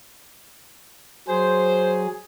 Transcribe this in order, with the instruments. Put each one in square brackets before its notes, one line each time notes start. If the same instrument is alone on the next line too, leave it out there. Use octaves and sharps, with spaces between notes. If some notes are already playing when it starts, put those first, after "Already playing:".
[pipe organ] F#3 G#4 [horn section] C5